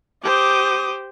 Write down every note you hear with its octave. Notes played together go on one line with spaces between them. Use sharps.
G4 C5 D6 D#6